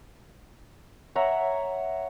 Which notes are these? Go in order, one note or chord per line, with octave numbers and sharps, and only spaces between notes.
C#5 E5 F#5 A#5